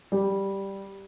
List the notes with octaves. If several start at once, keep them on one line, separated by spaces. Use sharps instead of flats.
G3 G4